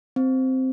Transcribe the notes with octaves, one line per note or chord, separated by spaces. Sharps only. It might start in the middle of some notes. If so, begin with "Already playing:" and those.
C4